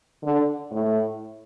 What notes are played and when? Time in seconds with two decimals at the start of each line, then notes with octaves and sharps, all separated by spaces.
0.23 D3
0.71 A2